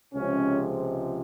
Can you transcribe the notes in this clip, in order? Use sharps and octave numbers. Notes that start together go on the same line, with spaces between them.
C#2 C3 F3 G#3 C#4